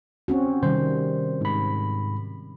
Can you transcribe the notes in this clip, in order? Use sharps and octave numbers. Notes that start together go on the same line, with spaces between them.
C4 C#4 F#4
C3 D#3 G3 C5
G#2 B5